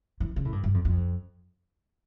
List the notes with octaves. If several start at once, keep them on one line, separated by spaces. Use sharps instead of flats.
E3
C#3
A2
G2
G2
F2
F2